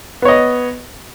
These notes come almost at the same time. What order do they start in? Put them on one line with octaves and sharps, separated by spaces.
B3 C#5 D#5